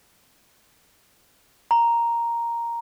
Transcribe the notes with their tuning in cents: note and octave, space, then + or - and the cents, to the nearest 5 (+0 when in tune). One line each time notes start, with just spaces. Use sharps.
A#5 +0